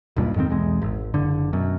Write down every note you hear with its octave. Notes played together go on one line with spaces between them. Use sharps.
D#1 B1 G2 A#2
F2 G#2 D#3 C4
B1 E2 G#3
G#1
F#1 D3
F#2 B2